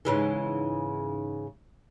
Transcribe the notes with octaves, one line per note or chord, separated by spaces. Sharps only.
G#2 C#3 E3